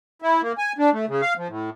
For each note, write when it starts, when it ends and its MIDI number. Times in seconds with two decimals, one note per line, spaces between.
0.22 0.41 64
0.42 0.52 58
0.58 0.72 80
0.78 0.90 62
0.93 1.05 57
1.08 1.22 49
1.22 1.34 77
1.37 1.48 53
1.48 1.70 45